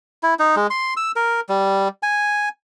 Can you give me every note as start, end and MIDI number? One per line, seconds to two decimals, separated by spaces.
0.23 0.34 64
0.39 0.55 63
0.56 0.67 56
0.70 0.94 84
0.97 1.12 88
1.16 1.41 70
1.49 1.88 55
2.03 2.49 80